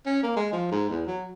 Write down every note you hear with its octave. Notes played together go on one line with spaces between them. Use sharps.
C#4
A#3
G#3
F3
G#2
E2
F#3